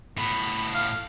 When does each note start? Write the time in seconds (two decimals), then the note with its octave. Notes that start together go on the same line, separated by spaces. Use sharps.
0.18 A2 B3 B5
0.74 F5